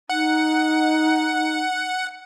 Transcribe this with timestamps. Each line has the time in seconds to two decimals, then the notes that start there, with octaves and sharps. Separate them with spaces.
0.10 D#4 F#5